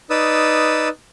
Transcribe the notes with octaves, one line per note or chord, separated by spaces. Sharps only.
D#4 B4 D5 D#6 E6